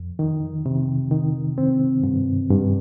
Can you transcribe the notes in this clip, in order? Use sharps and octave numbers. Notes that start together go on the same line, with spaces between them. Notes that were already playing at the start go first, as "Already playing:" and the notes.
Already playing: F2
D#3
C3
D#3
C4
G2
G2